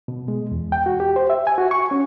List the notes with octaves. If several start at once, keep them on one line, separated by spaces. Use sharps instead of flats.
B2
G#3
E2
G5
F#4
G4
C5
E5
G#5
F#4
C#6
C#4